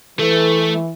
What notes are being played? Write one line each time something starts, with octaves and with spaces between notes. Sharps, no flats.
E3 A3